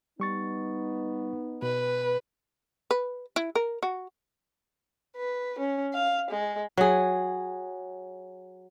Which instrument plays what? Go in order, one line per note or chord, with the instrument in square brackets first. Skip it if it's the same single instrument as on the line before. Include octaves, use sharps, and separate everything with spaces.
[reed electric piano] G3 C#6 A6 [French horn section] B3 D#4
[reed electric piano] B2 [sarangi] B4
[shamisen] B4
E4
A#4
F#4
[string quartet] B4
C#4
F5
G#3
[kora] F#3 G#4